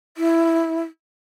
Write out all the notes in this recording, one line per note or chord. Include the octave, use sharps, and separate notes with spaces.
E4